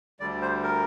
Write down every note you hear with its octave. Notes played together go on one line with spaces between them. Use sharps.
D2 D3 G3 D5
C5
A#4